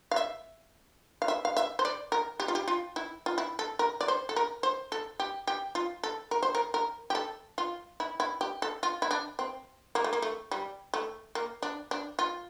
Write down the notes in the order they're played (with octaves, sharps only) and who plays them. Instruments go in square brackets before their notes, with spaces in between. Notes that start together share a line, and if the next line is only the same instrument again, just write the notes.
[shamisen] F5
E5
F5
E5
F5
E5
C5
D5
A#4
G4
F4
G4
F4
E4
F4
E4
A4
A#4
D5
C5
A4
A#4
C5
A4
G4
G4
F4
A4
A#4
C5
A#4
A#4
G4
A4
F4
E4
E4
G4
A4
F4
E4
D4
C4
A#3
A3
A#3
A3
G3
A3
A#3
D4
D4
F4